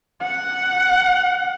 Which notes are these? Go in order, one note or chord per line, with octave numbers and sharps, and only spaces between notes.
F#5